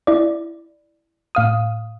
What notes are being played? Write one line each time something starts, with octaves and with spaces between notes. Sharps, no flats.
E4 D5
A2 F5 D#6